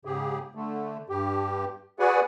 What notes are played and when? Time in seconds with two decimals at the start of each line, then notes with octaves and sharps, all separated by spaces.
0.05 G#2 C#3 G4 G#4
0.55 D3 A3
1.09 G2 G4
1.99 F#4 G#4 B4 D5 F#5 G#5